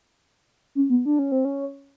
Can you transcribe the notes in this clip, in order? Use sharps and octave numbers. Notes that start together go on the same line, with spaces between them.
C#4
B3
D4
C#4
C4
C#4